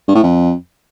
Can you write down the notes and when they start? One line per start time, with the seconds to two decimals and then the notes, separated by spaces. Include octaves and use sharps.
0.08 G2
0.15 A2
0.23 F2